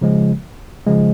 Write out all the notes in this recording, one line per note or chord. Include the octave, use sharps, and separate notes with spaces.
C#3 F3 G#3
C#3 F3 G#3